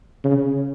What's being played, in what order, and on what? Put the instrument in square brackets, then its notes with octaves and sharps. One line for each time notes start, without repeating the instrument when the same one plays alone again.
[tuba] C#3